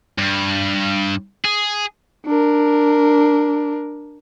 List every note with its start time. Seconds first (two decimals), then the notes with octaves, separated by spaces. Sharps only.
0.19 G2
1.45 G#4
2.26 D4 A#4